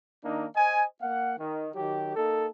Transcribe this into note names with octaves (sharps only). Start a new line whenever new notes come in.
D#3 A#3 D4 D#4
C5 D#5 G#5
A#3 F5 F#5
D#3
D#3 F#3 G4
A#3 D#4 A4